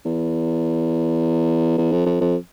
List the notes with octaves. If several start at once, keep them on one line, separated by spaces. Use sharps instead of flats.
E2
E2
F2
F2
F2